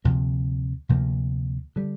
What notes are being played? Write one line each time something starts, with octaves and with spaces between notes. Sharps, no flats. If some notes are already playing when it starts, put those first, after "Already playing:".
D2 C3 F3 A#3
D2 C3 F3 A#3
D3 G3